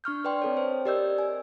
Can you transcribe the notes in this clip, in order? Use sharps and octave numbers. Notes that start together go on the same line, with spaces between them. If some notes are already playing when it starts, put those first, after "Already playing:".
D4 C#6 F6 G6
B4 D5 G5 C6
C4 A4 C#5
C5
G4 A#4 D5 D#5 E6 G6
G#5